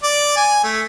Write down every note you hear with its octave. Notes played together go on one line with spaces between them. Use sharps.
D5
G#5
A3